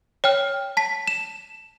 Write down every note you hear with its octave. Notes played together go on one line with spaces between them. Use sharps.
C#5 G5 F6
A5 B6
E7